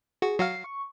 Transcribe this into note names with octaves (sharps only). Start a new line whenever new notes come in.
F#4 G#4
F#3 F#4 F5 C7
C#6